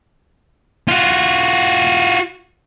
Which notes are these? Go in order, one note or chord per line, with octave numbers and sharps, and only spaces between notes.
F4 F#4